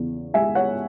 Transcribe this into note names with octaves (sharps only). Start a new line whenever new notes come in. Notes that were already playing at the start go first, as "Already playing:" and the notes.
Already playing: E2 C#3
G#3 E5 G#5
C#5 F#5